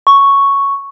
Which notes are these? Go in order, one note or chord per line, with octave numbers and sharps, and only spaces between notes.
C#6